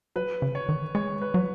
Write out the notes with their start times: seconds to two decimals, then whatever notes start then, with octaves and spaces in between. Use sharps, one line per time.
0.16 F#3 B4
0.42 C#3
0.55 C#5
0.69 D#3
0.95 G#3 C#5
1.22 B4
1.34 F#3